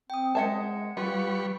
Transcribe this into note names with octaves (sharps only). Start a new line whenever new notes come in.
C4 G5 D#6
G#3 D#5 E5 F#5 A5 G#6 C#7
G3 F4 B4 B5 C#6